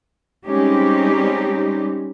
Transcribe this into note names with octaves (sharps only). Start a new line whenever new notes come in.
G3 G#3 C4 C#4 D#4 G4